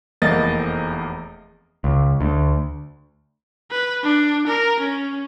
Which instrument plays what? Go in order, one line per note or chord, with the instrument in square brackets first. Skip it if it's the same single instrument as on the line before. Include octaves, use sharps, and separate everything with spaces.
[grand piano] F1 E2 A#3 D#5 A6
[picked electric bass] C#2
D2
[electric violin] B4
D4
A#4
C#4